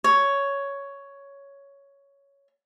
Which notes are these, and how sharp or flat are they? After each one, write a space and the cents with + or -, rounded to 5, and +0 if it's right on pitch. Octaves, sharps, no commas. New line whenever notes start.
C#5 +5